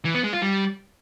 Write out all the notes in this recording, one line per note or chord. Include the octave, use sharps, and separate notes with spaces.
E3
B3
G#3
F4
G3